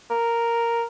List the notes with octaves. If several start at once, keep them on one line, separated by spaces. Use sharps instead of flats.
A#4